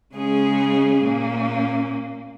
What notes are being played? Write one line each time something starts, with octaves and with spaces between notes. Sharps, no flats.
C#3 G#3 C#4 G#4
A#2 A#3 C#4